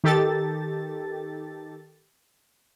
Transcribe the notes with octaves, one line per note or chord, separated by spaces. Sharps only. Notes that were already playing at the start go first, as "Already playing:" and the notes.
D#3 G4 A4 A6